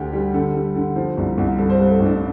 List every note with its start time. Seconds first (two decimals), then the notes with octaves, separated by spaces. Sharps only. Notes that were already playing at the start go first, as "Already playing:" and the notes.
Already playing: D2 D3 G4
0.13 G3
0.34 D3 A4
0.55 G3
0.75 D3
0.96 F3
1.17 C2
1.38 C2
1.58 G2 A4
1.70 C5
1.74 A4
1.80 G2
1.90 A4
2.00 A1
2.05 D4